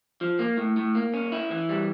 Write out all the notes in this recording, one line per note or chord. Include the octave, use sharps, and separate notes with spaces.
F3
A#3
A2
A2
A#3
C#4
E4
E3
G3